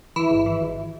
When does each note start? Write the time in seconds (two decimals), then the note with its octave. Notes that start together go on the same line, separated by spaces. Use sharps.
0.16 E3 E4
0.31 G#1
0.46 E3
0.61 G#1